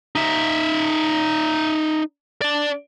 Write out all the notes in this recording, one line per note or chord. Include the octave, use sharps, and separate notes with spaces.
D#4 E5
D4 D5